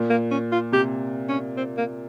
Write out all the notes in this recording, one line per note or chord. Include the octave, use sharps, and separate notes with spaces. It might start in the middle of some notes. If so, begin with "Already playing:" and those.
Already playing: A#2
A#3
C#4
F4
C3 G4
C#4
C4
A#3